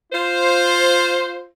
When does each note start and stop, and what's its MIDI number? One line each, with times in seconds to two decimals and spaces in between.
0.13 1.46 65
0.13 1.46 72